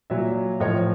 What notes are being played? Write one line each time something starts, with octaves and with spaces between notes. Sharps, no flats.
A#2 F#3 D5 E5
A2 F3 C#5 D#5